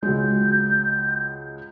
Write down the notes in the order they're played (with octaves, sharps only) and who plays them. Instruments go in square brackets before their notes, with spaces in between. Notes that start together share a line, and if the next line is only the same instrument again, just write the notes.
[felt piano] C#2 F#3 G#3 [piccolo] G6